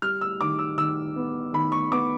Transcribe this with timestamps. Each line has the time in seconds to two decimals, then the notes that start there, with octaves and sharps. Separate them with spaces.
0.02 G3 F6
0.21 E6
0.41 D#3 D6
0.59 E6
0.78 D#3 E6
1.16 B3
1.53 D#3 B5
1.72 C#6
1.91 B3 D6